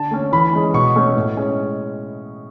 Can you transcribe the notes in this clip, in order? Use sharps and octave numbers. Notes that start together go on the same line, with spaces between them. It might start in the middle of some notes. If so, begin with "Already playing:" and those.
Already playing: D3 A5
A3 C#4
E3 B5
G#3 C#4
B2 C#6
A3 C#4
A2
G#3 C#4